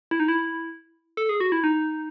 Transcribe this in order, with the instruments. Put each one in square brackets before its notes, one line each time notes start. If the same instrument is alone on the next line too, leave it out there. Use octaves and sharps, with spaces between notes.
[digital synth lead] E4
D#4
E4
A4
G#4
F#4
E4
D#4